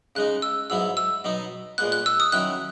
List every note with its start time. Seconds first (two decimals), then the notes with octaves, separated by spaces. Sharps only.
0.15 C#3 G#3 D#4 F#6
0.42 E6
0.70 G#2 F#3 B3 E4 E6
0.97 E6
1.24 B2 F#3 B3 D#4
1.78 A#2 G#3 B3 F#6
1.92 F#6
2.06 E6
2.20 D#6
2.32 D#3 F#3 C#4 E4 F#6